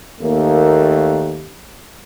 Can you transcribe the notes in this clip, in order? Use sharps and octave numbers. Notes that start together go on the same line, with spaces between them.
D#2 A3 A#3